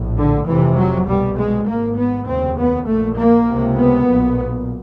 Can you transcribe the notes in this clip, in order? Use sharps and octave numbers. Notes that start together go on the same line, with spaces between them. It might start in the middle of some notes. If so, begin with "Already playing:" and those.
Already playing: A#1 A2
D3
F1 F2 C3 E3
F#3
C2 B2 G3
G#3
G#1 G#2 A#3
B3
F1 D#2 C#3 C4
B3
A#1 A#2 A3
A#3
C#2 C3
B3
B1 A#2